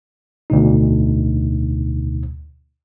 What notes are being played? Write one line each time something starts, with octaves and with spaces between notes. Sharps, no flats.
D2 B2 D#4